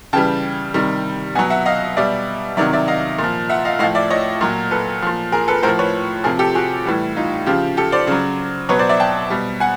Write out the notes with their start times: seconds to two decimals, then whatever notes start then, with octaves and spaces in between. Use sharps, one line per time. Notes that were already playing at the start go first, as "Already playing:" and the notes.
0.13 C#3 E3 G3 G5 A5
0.74 C3 D#3 G3
1.35 B2 F#3 F#5 G#5
1.50 E5 F#5
1.66 D#5 F5
1.97 B2 G3 D5 E5
2.57 C3 D#3 F#3 D5 E5
2.73 D5 E5
2.88 D#5 F5
3.19 A#2
3.24 F3
3.49 E5 F#5
3.65 D#5 F5
3.79 A2 D#5 F5
3.83 F3
3.95 D5 E5
4.10 C#5 D#5
4.41 A#2 F#3
4.71 A4 B4
5.02 A#2 F3
5.32 G#4 A#4
5.48 A4 B4
5.63 A2 A#4 C5
5.68 F3
5.79 B4 C#5
6.24 C3 F3 G#4 A#4
6.39 G4 A4
6.55 F#4 G#4
6.86 A2 E3 G3
7.16 D#4 F4
7.46 C#3 F3 F4 G4
7.77 G4 A4
7.92 C5 D5
8.07 C#3 F#3
8.69 B2 F#3 B4 C#5
8.79 C5 D5
8.89 D5 E5
9.00 G5 A5
9.30 B2 G3
9.60 F#5 G#5